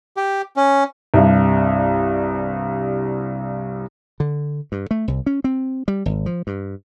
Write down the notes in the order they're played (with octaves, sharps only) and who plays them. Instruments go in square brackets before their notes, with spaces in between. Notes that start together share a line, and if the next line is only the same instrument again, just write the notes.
[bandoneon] G4
C#4
[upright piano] C2 G2
[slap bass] D3
G2
A3
C2
C#4
C4
G3
G#1
F3
G2